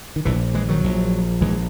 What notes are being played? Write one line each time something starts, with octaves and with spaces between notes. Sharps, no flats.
D#3
A#1 A#2 E3
E3 G#3
D#3 F#3
A#1 A#2
A#1 A#2 E3 G#3